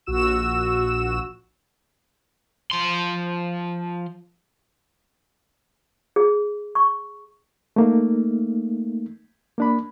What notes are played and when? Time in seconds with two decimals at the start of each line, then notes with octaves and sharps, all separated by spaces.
0.06 A#1 F#4 E6 E7
2.71 F3 C6
6.16 G#4
6.75 C#6
7.76 A3 A#3 D#4
9.58 A#3 D4 B5